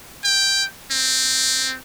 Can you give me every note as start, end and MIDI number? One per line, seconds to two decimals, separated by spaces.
0.24 0.65 79
0.91 1.76 60